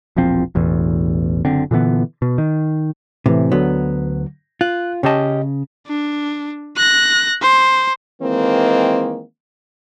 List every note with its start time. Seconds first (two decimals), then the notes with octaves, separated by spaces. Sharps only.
0.16 E1 A#1 F3 C4
0.55 E1 A1 E2
1.45 F#1 D3 C4
1.71 A#2 D3 E3 B3
2.22 B2
2.38 D#3
3.26 A2 C3 E3
3.52 D2 D3 F#3 B3
4.61 F4 F#6
5.03 C#3 C#4 G4 D#5 A5
5.87 D4
6.77 F#6 A#6
7.42 C5
8.21 D#3 E3 G#3 A#3 C4